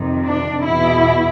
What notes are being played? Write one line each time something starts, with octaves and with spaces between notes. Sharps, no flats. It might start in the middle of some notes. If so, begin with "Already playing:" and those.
Already playing: F2 C3 D#3
D4
E2 B2 E4